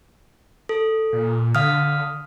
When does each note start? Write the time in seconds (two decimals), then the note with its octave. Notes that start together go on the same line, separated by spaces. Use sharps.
0.69 A4
1.12 A#2
1.55 D3 F5 D#6 F6